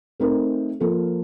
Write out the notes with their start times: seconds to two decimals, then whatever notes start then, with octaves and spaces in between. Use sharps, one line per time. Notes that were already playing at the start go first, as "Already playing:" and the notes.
0.20 A3 C4 D#4 A#4
0.80 F3 A#3 F4 A4